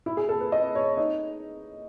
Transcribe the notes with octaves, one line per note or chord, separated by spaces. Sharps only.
E4
G#4
A4
B4
D#5
C#5
D#4